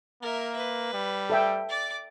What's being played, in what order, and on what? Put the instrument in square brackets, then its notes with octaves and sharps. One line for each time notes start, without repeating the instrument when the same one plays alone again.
[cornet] A#3 [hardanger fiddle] A#4 E5
[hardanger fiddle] B4
[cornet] G3
[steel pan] A4 E5 G5
[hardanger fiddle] D5 D6